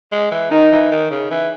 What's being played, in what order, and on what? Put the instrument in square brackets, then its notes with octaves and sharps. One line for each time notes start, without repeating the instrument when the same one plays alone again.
[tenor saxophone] G#3
E3
[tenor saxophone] D#3 [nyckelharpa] D#4
[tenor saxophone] E3
D#3
C#3
E3